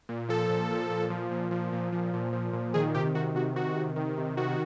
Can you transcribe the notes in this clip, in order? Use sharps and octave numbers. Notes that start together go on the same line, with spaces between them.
A#2
F3 A4
A#2
F3
A#2
F3
A#2
F3
A#2
F3
A#2
F3
A#2
D#3 G#4
C3 G4
D#3 F#4
C3 F#4
D#3 F#4
C3
D#3
C3
D#3 F#4